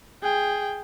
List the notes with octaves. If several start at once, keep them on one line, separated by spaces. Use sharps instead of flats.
G#4 G5